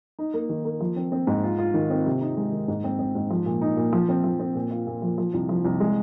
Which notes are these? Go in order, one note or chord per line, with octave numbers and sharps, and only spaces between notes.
D#4
A#3
D#3
A#3
F3
C4
C4
G#2
F4
F4
D#3
C4
C3
D#4
G#3
D#3
G#2
C4
C4
G#2
F3
A#2
D#4
A#2
F3
C4
F3
C4
A#2
F4
A#2
F3
F3
C2
F3
C2
G#3